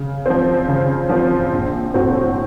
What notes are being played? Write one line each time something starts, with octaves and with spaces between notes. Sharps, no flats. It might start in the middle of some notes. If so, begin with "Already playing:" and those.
Already playing: C#3
F3 C4
C#3
F3 C4
A#1
A2 A3 C4 F#4